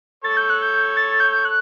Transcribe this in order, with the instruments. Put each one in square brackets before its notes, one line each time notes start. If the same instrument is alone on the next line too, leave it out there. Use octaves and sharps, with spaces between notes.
[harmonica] A4 C#5 [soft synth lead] A6
[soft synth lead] G6
F#6
G6
A6
G6
F#6